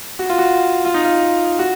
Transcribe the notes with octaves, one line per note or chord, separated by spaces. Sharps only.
F#4
F4
F#4
F4
D#4
F4
F#4